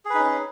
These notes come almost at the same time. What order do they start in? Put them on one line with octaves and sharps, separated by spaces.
G#4 B4 D#4 C#4